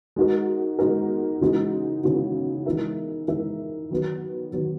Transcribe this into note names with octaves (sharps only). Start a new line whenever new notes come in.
G#3 D#4 F#4 A#4
G#3 D#4 F#4 A#4
C#3 E3 G#3 D#4 F#4
C#3 E3 G#3 D#4 F#4
E3 G#3 D#4 A#4 E5
E3 G#3 D#4 A#4 E5
D#3 F#3 B3 F#4
D#3 F#3 B3 F#4